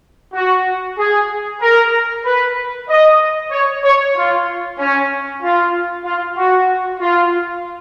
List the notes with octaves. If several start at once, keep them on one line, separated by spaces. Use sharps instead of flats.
F#4
G#4
A#4
B4
D#5
C#5
C#5
F4
C#4
F4
F4
F#4
F4